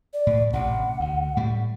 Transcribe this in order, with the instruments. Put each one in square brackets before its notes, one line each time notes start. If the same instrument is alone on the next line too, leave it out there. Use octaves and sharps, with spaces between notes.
[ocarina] D5
[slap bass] A2
[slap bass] A1 C3 [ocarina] F#5
[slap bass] D2
A2 G3